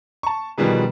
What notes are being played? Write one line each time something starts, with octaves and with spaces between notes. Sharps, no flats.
A5 C#6
B2 D#3 F3 G3 G#4 B4